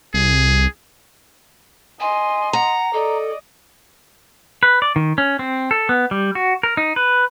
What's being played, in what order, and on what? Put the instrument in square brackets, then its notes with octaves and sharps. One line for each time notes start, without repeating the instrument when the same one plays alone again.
[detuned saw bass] C2 [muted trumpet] G#4
[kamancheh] D#5 C6 [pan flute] G#5
[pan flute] F#5 [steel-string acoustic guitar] A#5
[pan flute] A4 [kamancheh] D5 D#5
[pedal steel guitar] B4
D5
D#3
C#4
C4
A4
B3
G3
F#4
A#4
D#4
B4